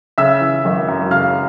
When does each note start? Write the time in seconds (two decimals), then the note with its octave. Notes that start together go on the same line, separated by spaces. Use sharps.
0.18 C#3 E5 E6
0.41 E3
0.65 G#1
0.88 F#2
1.10 C#3 F5 F6